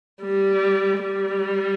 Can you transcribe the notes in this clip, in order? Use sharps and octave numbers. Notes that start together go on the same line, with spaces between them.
G3
G3